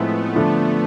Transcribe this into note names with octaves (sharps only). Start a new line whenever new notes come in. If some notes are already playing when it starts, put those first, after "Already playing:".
Already playing: A2 F3 G#3 A3 B3 C4 E4
D3 F3 A3 D4